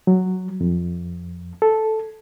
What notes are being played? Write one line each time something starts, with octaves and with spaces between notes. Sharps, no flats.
F#3
F2
A4